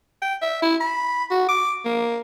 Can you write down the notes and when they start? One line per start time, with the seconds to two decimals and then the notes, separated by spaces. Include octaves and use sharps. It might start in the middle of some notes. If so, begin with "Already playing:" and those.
0.22 G5
0.42 E5
0.62 E4
0.81 B5
1.31 F#4
1.49 D6
1.85 A#3